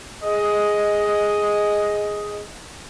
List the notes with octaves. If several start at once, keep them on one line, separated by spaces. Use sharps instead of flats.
G#4 D#5